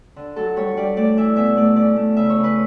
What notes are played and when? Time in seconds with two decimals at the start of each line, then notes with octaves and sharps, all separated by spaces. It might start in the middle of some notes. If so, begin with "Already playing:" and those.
0.16 D3
0.36 F#3 A4
0.56 G3 C#5
0.77 G3 D5
0.96 A3 D5
1.17 E3 E5
1.36 B2 E5
1.56 A3 D5
1.76 C#4 D5
1.96 A3
2.16 C#3 E5
2.30 C#5
2.36 C#3
2.44 B4